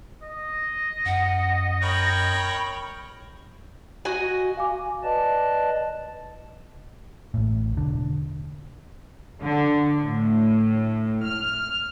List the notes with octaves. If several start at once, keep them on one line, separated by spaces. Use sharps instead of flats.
D#5
F#2 F#5
A#4 C#5 G5 B5
F#4 D#5 G#5
F5 G#5 D6
B4 D5 D#5 A5
A1 A2
E1 D3
D3
A2
F6